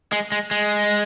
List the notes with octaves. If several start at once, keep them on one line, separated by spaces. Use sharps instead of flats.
G#3
G#3
G#3